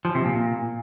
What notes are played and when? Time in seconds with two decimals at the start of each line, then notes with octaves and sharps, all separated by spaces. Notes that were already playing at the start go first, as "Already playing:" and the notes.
0.05 F3
0.15 C3
0.25 A#2